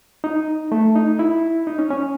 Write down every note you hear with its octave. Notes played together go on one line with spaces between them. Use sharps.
D#4
A3
D#4
E4
D#4
C#4
C#4